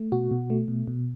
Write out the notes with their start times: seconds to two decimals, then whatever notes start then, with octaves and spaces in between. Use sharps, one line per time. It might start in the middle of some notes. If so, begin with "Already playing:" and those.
Already playing: A3
0.12 B2 F#4
0.31 B2
0.50 A3
0.68 B2
0.87 B2